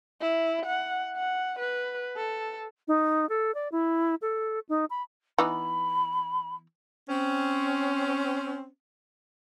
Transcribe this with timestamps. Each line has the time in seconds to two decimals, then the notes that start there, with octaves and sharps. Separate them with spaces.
0.21 E4
0.66 F#5
1.16 F#5
1.59 B4
2.16 A4
2.88 D#4
3.29 A4
3.55 D5
3.72 E4
4.22 A4
4.69 D#4
4.90 B5
5.39 E3 B3 D#4 B5
7.08 C4 C#4